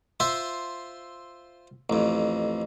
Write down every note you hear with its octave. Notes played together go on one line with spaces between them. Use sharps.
F4 C5 E5
A1 F2